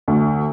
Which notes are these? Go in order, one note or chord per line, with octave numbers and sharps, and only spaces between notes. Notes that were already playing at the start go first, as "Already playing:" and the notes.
D2